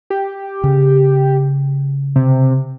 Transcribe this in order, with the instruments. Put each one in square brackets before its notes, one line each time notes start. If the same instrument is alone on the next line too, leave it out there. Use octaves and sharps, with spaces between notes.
[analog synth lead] G4
[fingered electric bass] C#3
[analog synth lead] C3